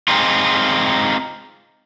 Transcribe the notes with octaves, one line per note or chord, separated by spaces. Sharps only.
G#3 C4 D#4 F4